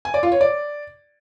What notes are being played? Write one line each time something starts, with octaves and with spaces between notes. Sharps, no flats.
G#5
D5
F4
C#5
D5